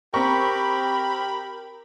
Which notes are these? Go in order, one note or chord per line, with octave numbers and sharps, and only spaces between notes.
C4 G4 A#4 B5 C#6